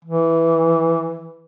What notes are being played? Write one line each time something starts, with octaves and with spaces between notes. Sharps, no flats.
E3